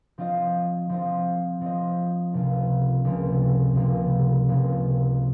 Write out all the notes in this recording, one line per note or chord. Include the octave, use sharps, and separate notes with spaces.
F3 C4 F4 C5 D#5
F3 C4 F4 C5 D#5
F3 C4 F4 C5 D#5
C#2 C3 F3 A#3 F4
C#2 C3 F3 A#3 F4
C#2 C3 F3 A#3 F4
C#2 C3 F3 A#3 F4